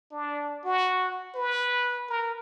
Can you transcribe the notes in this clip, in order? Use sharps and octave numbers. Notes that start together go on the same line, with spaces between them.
D4
F#4
B4
A#4